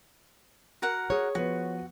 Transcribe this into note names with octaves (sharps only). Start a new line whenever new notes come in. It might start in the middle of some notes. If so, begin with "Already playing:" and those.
F#4 A#4 F#5
G#4 C#5
F3 B3 F#4 B4